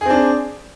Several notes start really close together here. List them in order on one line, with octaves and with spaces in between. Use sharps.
G#4 C4 D4